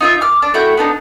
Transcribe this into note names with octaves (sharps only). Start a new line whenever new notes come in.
D#4 F4 E5
D6 F6
D4
A3 E4 F#4 G5
B3 D4 D#4